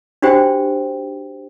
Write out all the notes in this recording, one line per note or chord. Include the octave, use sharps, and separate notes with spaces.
D4 F#4 G4 C5 G5